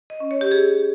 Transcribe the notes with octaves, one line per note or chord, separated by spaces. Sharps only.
D#5
C#4
C#5
G4
G#4